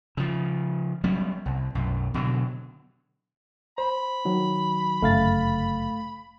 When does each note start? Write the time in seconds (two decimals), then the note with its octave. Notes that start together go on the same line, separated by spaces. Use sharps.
0.17 C#3 F3
1.04 F#3 G3 B3 C#4
1.46 C2
1.75 B1 F#2
2.14 B2 D3 F#3
3.78 C5 B5
4.25 D#3 F#3
5.02 G1 F#2 C#3 A3 F5 A6